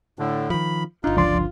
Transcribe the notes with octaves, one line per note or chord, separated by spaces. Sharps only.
A2 D3
D#3 F3 B5
G1 D4 D#4 F4
C#2 F3 D5 C6